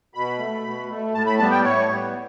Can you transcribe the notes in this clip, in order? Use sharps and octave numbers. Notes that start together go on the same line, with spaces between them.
B2 B5
A3
B2
A3
A2 A5
B5
G3 B3 A5
G5
A2 C#5
G3 B3